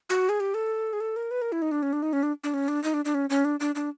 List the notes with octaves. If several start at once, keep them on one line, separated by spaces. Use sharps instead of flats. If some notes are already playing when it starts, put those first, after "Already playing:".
F#4
G#4
G4
A4
G#4
A4
A#4
B4
A#4
E4
D#4
D4
C#4
D4
D#4
C#4
D4
D4
C#4
D4
D#4
D4
D4
C#4
C#4
D4
D4
D4